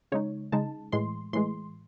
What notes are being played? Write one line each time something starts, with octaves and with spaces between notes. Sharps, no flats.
C#3 G#3 D#4 C#5
C#3 G#3 D#4 A5
A2 E3 G#3 C6
A2 E3 G#3 C6